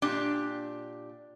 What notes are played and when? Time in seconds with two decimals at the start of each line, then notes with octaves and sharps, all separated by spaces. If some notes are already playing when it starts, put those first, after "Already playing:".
0.02 A#2 D4 G4